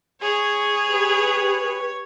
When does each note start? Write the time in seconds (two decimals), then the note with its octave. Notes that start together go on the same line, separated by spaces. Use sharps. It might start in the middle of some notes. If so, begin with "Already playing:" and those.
0.22 G#4 C#5
0.89 G4 B4